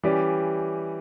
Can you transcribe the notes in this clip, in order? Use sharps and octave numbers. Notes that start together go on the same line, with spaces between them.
E3 G3 C#4 G4 D5